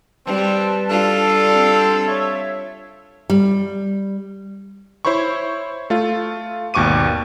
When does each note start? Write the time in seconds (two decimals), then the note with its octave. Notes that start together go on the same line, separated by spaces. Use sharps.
0.26 G3 C4 B4 A5
0.89 G3 D4 F4 A4
1.54 C4
2.07 C#5 E5
3.30 G3
5.05 E4 C5 C#5 B5 C#6
5.90 A3 F4
6.74 G#1 D#2 B2 C#6 D6 D#7